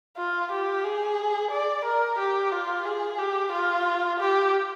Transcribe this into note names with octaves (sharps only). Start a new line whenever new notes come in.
F4
G4
G#4
D5
A#4
G4
F4
G#4
G4
F4
G4